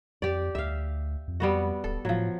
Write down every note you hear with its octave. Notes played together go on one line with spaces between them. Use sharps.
F2 G4 D5
D2 E5 F5
F2
G3 B3 F#4
D1 A4
A2 F3 F#3